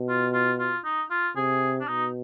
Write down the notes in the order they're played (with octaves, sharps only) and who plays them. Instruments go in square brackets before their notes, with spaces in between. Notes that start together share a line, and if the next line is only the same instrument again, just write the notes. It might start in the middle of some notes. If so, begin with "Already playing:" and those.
Already playing: [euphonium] B2
[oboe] F4
F4
F4
D#4
F4
[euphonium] C3 [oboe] G#4
[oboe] D4
[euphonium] B2 [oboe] D#4